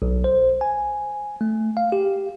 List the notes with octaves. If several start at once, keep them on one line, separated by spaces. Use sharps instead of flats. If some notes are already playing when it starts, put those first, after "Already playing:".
B1
C5
G#5
A3
F5
G4